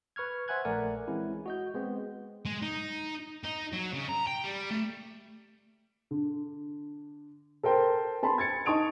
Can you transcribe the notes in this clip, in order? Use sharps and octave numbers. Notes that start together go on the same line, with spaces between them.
B4 C#6 F6 G#6
C5 E5 F#5 G#5 F#6 G#6
A#1 A3 A#4 D5 F#5 G#5
E3 G#3 C4 C#4 E4
F#4 D#5 G6
G#3 B3 C4
G#3
D#4
D#4
F#3
C#3
A#5
G5
G3
A3
D3
A4 A#4 C5 G5
B3 A5 B5 C6
G#6 A6 C#7
D#4 A5 C#6 D#6 D7 F7